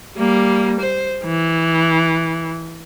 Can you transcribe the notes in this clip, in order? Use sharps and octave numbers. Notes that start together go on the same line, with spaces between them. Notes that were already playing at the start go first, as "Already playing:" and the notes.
G3 A#3
C5
E3